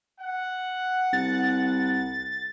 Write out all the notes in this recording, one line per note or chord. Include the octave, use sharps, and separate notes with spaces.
F#5
C2 A6